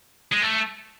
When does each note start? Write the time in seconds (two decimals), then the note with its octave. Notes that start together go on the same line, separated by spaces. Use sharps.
0.32 G#3
0.42 A3